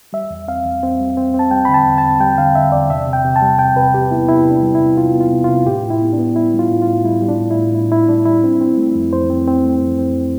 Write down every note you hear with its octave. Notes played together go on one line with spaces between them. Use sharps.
G3 E5
E2
C4 F5
E2
C4
G3
C4
C4
A5
G3 G5
D3 B5
A5
E2
A5
C4
G3 G5
D3 F5
D3 E5
E2 D5
C3 E5
C3
G5
C3
A5
G3
C3 G5
C3 B4
C3 G4
B3 E4
C3 E4
C3
D4
G3
C3 E4
C3 F4
B3
F4
C3
C3 F4
A2 G4
A2
E4
B3
D4
B3
G3 E4
G3
F4
A2
F4
A2
G3 E4
G3
D4
A2
E4
A2
A2 E4
A2 E4
G3 D4
G3 E4
C4
C4
A3
F2
F2 C5
C4
C4
A3
F2
C4